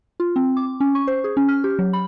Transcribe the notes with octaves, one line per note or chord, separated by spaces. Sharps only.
F4
C4
D6
C#4
C#6
C5
G#4
C#4
F6
G4
F#3
B5